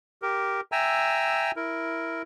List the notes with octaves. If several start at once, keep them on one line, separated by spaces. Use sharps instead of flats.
G4 A#4
E5 G5 G#5 A#5 E6
E4 A#4